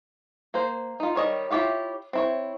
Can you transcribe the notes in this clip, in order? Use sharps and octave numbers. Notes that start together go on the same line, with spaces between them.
A#3 C5
D#4 F4
D#3 G3 C#5 D#5
E4 F4 G4 C#5 F5
C4 E4 C#5